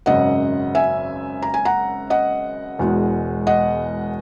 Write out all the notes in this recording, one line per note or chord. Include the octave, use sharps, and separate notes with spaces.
G#1 F#2 C#3 D#5 F#5
E5 G#5
A#5
G#5
F#5 A#5
D#5 F#5
E1 E2 B2 G#3
D#5 F#5